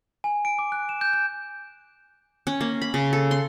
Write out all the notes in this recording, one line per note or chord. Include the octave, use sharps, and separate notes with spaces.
G#5
D7
D6
F#6
E7
G6
G6
C#4
A#3
B5
C#3
A4
C6